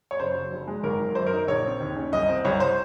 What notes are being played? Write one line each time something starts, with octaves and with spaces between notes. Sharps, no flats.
C#5
F#1 C5
F#3
F1
G#3
G#1 A#4
F#3
F#2 C5
A#4
D#4
A#1 C#5
C4
D#2
C#4
C2 D#5
C4
C2 C#5
C5